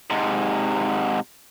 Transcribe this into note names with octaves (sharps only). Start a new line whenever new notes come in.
G#2 C3